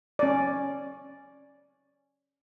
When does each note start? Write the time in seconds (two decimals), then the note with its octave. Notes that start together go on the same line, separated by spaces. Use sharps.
0.19 C#4 D5